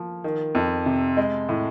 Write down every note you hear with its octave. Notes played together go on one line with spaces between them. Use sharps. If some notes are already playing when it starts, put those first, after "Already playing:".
Already playing: F3 A#3
D#3
F2
C3
G#3
A2